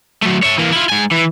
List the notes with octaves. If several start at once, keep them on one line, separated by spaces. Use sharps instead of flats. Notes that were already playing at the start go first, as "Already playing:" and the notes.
F#3 A3
C#5 E5
E3 A#3
E4 F4
G#2 G#5
E3